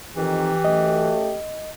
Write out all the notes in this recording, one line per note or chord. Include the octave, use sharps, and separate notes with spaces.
F2 D#3 E3 G4
F#2 A3 D#5